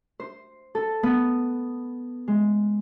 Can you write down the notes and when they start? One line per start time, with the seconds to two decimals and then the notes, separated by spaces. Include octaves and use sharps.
0.20 C5
0.75 A4
1.03 B3
2.28 G#3